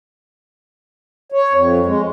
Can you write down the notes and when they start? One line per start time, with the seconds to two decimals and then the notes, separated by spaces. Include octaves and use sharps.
1.32 C#5
1.53 F2
1.86 G#3